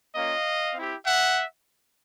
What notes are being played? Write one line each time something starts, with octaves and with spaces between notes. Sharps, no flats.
A#3 C#4 F4 D#5 F5
C4 E4 G4
E5 F#5